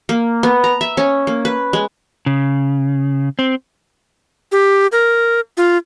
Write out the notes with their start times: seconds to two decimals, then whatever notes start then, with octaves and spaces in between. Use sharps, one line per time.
0.09 A#3
0.43 B3
0.64 A#5
0.81 E5
0.97 C#4
1.27 A#3
1.45 B4
1.73 G#3
2.26 C#3
3.39 C4
4.52 G4
4.92 A#4
5.57 F4